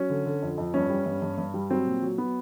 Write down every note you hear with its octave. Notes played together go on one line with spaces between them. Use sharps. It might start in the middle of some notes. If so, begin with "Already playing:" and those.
Already playing: F#3 C#4
D3
D3
F2
F2
G2 C#4
G3
G2
G2
G2
G3
F#3 C4
A#2
F#3
F#3 B3